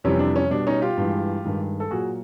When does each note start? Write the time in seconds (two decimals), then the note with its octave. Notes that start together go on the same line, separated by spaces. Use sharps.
0.04 F2 C3 E3 G3 C#4
0.19 D4
0.36 C#4
0.50 B2 G3 D4
0.67 C#4 D#4
0.82 F4 G4
0.97 G2 E3 G#3
1.45 G2 D#3 G#3
1.80 A4
1.91 A#2 F#3 F#4 G#4